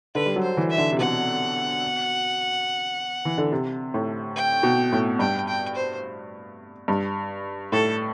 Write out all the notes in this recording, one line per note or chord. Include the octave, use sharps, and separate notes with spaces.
D3 B4
G3
F#3
C5
E3
E5
D3
C3
B2 F#5
E3
D3
C3
A2
G5
B2
A2
G2 G5
G5
C5
G2
A2 A4